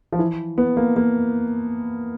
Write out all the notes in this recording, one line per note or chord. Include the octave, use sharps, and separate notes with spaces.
F3
E3
B3
A#3
A#3